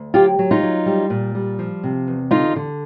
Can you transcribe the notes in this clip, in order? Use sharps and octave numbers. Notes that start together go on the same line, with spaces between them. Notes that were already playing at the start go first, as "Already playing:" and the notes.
Already playing: D2
F#3 F4 G4
F#3
D#4 F4
F#3
G3
A#2
G3
F3
C3
E2
D3 D#4 F4
D3